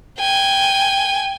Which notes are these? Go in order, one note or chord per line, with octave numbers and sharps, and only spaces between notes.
G5 G#5